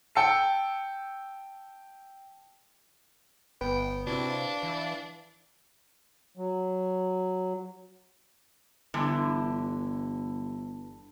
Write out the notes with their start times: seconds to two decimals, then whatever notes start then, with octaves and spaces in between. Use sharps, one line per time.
0.15 G5 A5 E6 C#7
3.61 G1 B3 B4 G5
4.07 C3 C4 D4 E4 F#4
4.30 D5 F5
4.63 E3
6.37 F#3
8.94 G1 G2 D3 E3